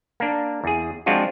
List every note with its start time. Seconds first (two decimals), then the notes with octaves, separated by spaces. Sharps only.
0.20 A#3 D4
0.64 E2 G#4
1.06 F3 G#3 C4 D4 F4 F#4